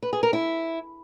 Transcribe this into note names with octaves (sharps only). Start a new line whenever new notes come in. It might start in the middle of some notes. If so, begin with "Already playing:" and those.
B4
G#4
A#4
E4